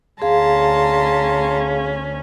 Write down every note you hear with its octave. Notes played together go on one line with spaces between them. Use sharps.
D2 C#4 G#4 F5 A5 A#5 C6